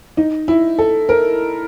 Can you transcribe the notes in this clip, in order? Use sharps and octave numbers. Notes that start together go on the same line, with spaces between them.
D#4
E4
A4
A#4